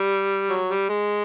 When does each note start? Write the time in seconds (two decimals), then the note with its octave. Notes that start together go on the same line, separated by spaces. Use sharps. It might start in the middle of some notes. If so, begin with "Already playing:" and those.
Already playing: G3
0.50 F#3
0.70 G3
0.89 G#3